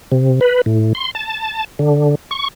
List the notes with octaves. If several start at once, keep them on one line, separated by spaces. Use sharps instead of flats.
C3
B4
A2
C6
A5
D3
C#6